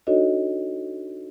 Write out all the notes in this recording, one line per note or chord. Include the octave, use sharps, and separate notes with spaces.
D4 D#4 F#4 A4 C#5 D#5